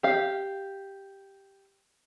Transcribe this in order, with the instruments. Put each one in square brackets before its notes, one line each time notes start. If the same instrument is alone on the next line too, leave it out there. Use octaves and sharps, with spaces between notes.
[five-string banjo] G4 F5